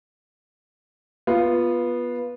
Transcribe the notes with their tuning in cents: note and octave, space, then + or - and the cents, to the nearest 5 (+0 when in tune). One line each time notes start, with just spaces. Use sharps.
B3 -15 F4 +0